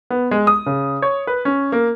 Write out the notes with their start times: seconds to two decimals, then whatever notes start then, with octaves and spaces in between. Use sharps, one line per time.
0.10 B3
0.31 G#3
0.47 D#6
0.66 C#3
1.02 C#5
1.27 B4
1.45 C#4
1.72 A#3